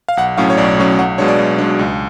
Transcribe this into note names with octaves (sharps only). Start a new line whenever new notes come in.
F5
B1 F#5
A2 F#3 C#4 F5
C#5
B1 D5
A2 F#3 C#4
B1 F#5
B2 G#3 D4 C#5
D5
B1
B2 G#3 D4
C#2